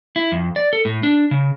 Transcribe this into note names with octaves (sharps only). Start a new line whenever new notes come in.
E4
F2
D5
A4
A2
D4
C#3